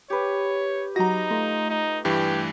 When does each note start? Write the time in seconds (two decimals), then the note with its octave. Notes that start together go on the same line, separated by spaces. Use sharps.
0.10 G4 B4 C#5
0.96 F#3 D#4 F#4 A#5 A#6
1.31 A3 F4
1.70 D#4
2.05 G2 E3 G4